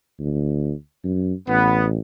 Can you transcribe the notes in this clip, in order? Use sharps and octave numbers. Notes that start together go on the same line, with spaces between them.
D2
F#2
A1 B3